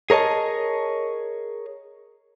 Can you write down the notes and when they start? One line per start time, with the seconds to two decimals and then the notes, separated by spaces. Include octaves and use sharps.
0.10 G#4 A#4 C#5 D#5 A5